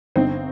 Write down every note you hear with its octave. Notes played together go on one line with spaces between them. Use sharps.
G1 C4 D#4